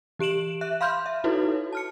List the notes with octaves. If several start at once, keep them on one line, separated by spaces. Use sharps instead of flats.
E3 G4 D7 E7 F#7
E5 F#6
F5 B5 C6 F6 G6
E5
D#4 E4 F#4 A4 B4 C#5
A5 F6 C#7